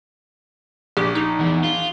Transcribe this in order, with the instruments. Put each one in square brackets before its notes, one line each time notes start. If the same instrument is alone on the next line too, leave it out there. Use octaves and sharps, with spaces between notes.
[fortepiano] A#1 [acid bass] G4
[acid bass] D#4
[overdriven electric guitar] E2
F4